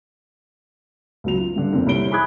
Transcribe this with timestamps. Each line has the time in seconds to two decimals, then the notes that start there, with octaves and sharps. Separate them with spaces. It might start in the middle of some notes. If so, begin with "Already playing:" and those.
1.24 C#2 F#3 F7
1.38 F4
1.56 G2 D3
1.73 F1 A#3 C4
1.87 C2 G3 C#5 E5 D7 G7
2.11 G#4 B5 D6 D#6 F#6 G#6